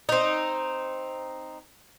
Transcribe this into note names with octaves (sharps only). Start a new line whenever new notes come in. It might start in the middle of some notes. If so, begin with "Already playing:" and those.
C4 D#4